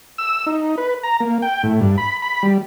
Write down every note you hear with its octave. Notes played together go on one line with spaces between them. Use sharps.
E6
D#4
B4
A#5
A#3
G5
A2
G2
B5
B5
G3